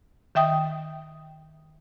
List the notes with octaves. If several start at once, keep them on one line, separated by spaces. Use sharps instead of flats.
D#3 E5 G5 D#6